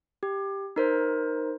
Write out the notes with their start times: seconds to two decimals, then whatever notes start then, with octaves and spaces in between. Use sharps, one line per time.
0.23 G4
0.76 D#4 A#4 C5